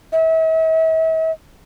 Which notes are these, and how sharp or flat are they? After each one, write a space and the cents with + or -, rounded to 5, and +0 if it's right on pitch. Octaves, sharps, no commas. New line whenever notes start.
E5 -40